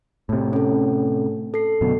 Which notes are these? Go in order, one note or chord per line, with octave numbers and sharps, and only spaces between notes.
A2 C3
C#4 A4
A4 C7
F#2 B2 D3